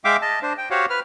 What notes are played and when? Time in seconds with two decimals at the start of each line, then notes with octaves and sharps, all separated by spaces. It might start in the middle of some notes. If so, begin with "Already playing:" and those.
0.05 G#3 E5 F5 G5 D6
0.22 D#5 A5
0.42 D4 C5
0.58 G5
0.70 F#4 G4 C5 C#5 F5 F#5
0.90 B4 F6